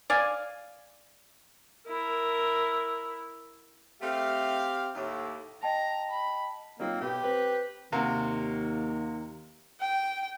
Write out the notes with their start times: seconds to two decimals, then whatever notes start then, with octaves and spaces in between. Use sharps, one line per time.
0.10 D5 F5 G#5
1.87 E4 A#4
4.02 A3 C4 G4 F5
4.95 D#2 A2
5.63 D#5 G5 A5 A#5
6.11 B5
6.80 F#3 A#3 C4 D#4 F4
7.01 B1 G4 B4
7.23 C4 B4
7.92 D#2 C3 A#3 F#4
9.81 G5